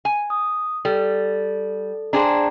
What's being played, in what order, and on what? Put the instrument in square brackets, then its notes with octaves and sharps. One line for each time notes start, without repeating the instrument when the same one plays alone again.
[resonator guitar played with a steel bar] G#5
[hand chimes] D#6
[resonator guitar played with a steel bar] G3 [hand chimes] A4
[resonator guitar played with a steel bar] D4 G#4 C5 [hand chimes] G5 A#5